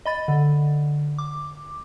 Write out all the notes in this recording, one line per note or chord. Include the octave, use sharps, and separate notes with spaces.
D#5 B5 A6
D3
D6